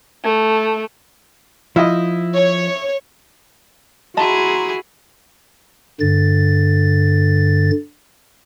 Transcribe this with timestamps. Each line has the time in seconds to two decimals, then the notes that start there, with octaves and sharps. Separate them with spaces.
0.24 A3
1.76 F3 E4 D#5
2.35 C#5
4.17 E4 F#4 G#4 D#5 A5 A#5 C6
6.00 G2 D3 A6